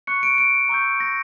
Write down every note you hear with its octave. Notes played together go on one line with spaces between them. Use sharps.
C#6 F#6 C#7
D7
D7
A#5 C#6 E6 G6
A#6